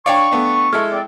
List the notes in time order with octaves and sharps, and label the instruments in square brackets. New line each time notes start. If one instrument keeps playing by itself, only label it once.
[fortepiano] D4 C#5 D5 [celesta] F5 G5 [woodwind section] C#6
[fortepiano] A3 B3 D4
[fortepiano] G#3 E4 A4 [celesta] F6
[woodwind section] C4 D5